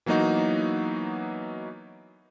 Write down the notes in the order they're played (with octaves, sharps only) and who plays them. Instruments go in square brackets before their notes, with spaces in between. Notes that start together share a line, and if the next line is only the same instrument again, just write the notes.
[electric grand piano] E3 F#3 A#3 B3 D#4 F#4